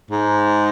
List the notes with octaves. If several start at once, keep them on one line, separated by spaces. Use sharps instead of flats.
G#2